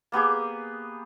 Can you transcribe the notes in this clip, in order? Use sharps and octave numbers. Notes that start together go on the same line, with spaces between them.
A#3 B3 G4 G#4